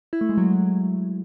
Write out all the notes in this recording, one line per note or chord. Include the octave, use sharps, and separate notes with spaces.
E4
A3
G#3
F#3